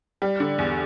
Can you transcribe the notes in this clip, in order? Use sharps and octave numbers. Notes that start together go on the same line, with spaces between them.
G3
D3
E2